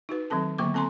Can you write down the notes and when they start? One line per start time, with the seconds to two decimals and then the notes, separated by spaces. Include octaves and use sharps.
0.09 D#4 F#4 B4
0.30 D#3 F#3 C4 A4 A5
0.58 D3 F#3 A#3 B3 D6
0.74 C4 A4 G#5 A#5 C6